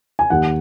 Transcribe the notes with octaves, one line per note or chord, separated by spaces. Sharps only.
G#5
D#2 F#5